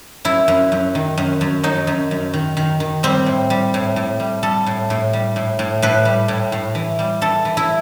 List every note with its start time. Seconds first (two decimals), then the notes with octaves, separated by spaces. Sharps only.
0.25 F#2 E4
0.48 F#2
0.72 F#2
0.95 D#3
1.17 F#2
1.41 F#2
1.63 F#3 D#4
1.87 F#2
2.11 F#2
2.34 D#3
2.57 D#3
2.80 D#3
3.03 G3 C4
3.26 A2
3.50 G3
3.74 A2
3.96 A2
4.20 G3
4.43 G3 A4
4.66 A2
4.90 A2
5.13 G3
5.36 A2
5.59 A2
5.82 A2 B4
6.05 G3
6.28 A2
6.52 A2
6.75 E3
6.99 G3
7.21 E3 A4
7.45 E3
7.57 E4